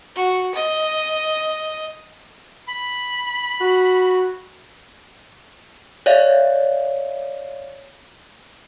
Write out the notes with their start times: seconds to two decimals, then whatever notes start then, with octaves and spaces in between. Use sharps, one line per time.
0.16 F#4
0.55 D#5
2.68 B5
3.61 F#4
6.06 C#5 D5 E5 F5